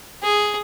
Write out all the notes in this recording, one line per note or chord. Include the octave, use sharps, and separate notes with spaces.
G#4